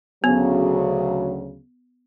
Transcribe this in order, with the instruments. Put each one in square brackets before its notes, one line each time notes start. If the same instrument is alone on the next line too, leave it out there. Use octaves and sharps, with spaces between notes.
[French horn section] D2 C#3 F#3 [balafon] B3